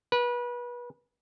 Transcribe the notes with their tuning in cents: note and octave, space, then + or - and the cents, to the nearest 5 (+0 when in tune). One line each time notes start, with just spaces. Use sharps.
B4 -30